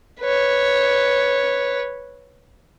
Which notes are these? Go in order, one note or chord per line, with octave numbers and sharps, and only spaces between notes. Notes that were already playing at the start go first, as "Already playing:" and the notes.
B4 C#5